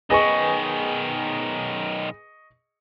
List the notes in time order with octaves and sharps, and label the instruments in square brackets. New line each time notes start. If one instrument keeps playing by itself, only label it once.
[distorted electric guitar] B1 D#3 [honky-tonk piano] G#4 B4 [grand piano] D#5 C#6